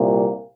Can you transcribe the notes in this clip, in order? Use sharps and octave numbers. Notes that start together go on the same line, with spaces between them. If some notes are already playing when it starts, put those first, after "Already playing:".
Already playing: C2 A#2